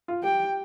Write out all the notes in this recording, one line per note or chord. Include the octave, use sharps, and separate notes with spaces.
F4
G4 G5